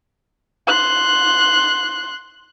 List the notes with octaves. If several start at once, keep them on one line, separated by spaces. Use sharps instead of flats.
C6 F#6